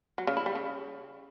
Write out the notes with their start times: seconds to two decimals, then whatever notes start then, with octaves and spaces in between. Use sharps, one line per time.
0.18 F#3
0.27 C#3
0.37 E4
0.46 G3
0.55 C#3